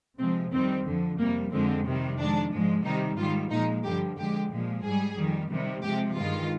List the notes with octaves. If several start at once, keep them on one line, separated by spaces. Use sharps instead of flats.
C3 F3 G#3 C4
F2 D#3 G3 C4
F2 D3 F3
F2 C3 G3 A#3
F2 D3 F3 G#3 C4
C3 D#3 G3
F2 D#3 G#3 D4
G#2 F3 G#3
C3 D#3 G3 D#4
G#2 D#3 G3 F4
A#2 F3 G#3 D#4
G2 D3 F3 G4
F2 D3 G#3 G4
A#2 F3 G#3
G#2 G3 G#4
F2 D#3 G3
C3 D#3 G3
C3 F3 G#3 G4
G2 D#3 G#3 F4